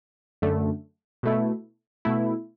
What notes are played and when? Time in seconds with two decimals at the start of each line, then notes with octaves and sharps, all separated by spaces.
0.42 F#2 D3 A3
1.23 B2 A3 E4
2.05 B2 A3 E4